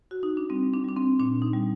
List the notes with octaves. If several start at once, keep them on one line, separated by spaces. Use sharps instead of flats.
F#4
D#4
D4
G3 C4
D4
G3 D4
C4
A#2 D4
D#4
G3